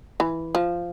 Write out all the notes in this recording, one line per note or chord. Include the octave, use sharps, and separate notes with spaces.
E3
F3